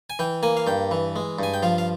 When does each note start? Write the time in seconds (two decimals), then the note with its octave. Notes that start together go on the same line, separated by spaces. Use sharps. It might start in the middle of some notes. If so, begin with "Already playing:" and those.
0.10 G#5
0.19 E3 G5
0.43 A#3 G#5
0.57 F5
0.67 G2 G5
0.91 E3
1.16 G#3
1.39 G2 G#5
1.54 G5
1.63 F3 F5
1.78 F5